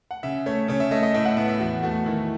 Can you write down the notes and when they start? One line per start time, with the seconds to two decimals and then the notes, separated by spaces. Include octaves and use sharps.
0.11 F#5
0.23 C#3 E5
0.46 A3 C#5
0.68 C#3 C#5
0.80 E5
0.91 A3 D#5
1.03 D#5
1.14 A2 E5
1.25 F#5
1.37 B3 E5
1.49 E5
1.60 E2 F#4
1.82 A3 F#4
2.06 D#3 E4